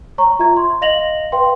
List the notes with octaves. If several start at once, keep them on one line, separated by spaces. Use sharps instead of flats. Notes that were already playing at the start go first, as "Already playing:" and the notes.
C#5 A#5 C#6
F4 E5 A#5 G#6
C6
D#5 F5 A#6 F7 F#7
B4 F5 G5 C6